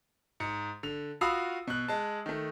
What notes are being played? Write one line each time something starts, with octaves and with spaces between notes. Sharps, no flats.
G#2 C#7
D3 F7
F4 F#4 F5 B5 D#6 E6
B2 F#6
G#3 A5
D#3 A3